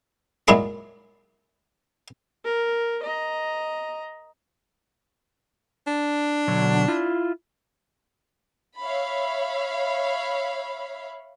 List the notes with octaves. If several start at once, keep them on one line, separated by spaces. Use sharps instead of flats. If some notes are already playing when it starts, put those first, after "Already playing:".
A#2 F#3 G#3 E4 G#4 C6
A#4
D#5 A#5
D4
B2 D3 F#3
E4 F4
C#5 E5 F5 B5